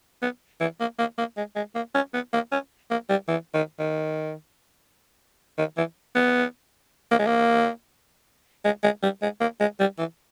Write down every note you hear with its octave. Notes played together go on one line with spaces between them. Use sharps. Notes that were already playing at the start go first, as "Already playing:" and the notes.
B3
E3
A#3
A#3
A#3
G#3
G#3
A#3
C#4
B3
A#3
C#4
A#3
G3
E3
D#3
D#3
D#3
E3
B3
A#3
G#3
A#3
G#3
G#3
G3
G#3
A#3
G#3
G3
E3